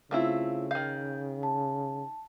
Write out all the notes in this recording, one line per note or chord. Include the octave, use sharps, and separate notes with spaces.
C#3 A3 C4 E4 F4 F5
D#3 F5 G6
A5